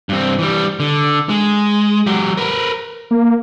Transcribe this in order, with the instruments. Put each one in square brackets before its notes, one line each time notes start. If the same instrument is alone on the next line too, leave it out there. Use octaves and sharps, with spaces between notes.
[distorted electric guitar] G2 C4
E3 G3
D3
G#3
F#3 G4
A#4 B4
[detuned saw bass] A#3